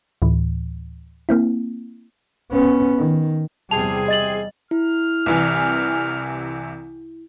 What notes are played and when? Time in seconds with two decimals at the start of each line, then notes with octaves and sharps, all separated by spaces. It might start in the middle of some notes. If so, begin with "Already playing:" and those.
0.22 D2 A2 E3
1.29 A#3 C4 E4
2.52 B3 C#4
2.97 D#3
3.71 E2 C3 G3 C4 E4 G#4 A5 F7
4.08 D#5 A6 F#7
4.71 E4 F6
5.26 C2 C3 E3